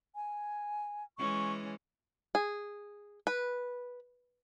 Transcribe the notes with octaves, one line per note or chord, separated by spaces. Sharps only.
G#5
E3 G#3 C#4 C#6
G#4
B4